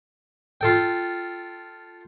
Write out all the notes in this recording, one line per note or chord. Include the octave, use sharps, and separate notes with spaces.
F4 A4 G5